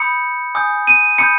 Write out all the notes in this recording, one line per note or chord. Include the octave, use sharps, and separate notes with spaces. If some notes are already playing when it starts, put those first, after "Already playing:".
Already playing: B5 D#6 G6 C#7
G#5 D#6 G6
D#7
B5 D#6 G6 C#7